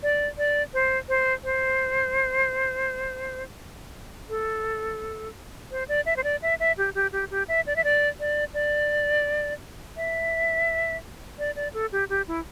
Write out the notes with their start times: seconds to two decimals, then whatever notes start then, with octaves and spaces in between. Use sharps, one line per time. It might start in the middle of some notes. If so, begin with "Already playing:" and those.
0.03 D5
0.38 D5
0.74 C5
1.09 C5
1.44 C5
4.29 A4
5.71 C5
5.88 D5
6.06 E5
6.16 C5
6.24 D5
6.42 E5
6.60 E5
6.78 G4
6.95 G4
7.12 G4
7.31 G4
7.48 E5
7.66 D5
7.76 E5
7.84 D5
8.20 D5
8.54 D5
9.97 E5
11.39 D5
11.56 D5
11.74 A4
11.92 G4
12.09 G4
12.28 E4